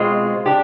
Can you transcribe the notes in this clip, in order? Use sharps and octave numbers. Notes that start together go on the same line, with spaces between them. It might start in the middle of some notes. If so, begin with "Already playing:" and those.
Already playing: B2 G#3 C4 F4
D4 G4